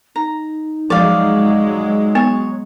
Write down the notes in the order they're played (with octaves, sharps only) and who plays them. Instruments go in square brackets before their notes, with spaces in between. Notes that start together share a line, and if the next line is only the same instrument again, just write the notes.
[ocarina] D#4 [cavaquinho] A#5
[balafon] F3 [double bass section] F#3 G#3 [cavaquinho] D5 F5
[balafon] B3 [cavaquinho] C#5